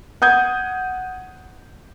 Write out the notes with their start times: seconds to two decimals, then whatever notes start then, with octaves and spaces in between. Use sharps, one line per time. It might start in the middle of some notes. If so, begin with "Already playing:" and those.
0.22 F#5 D#6 G6 G#6